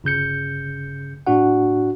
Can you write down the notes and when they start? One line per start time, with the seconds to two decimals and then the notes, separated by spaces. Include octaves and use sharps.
0.04 G1 C#3 G6 C#7
1.27 A2 D4 F#4 F#5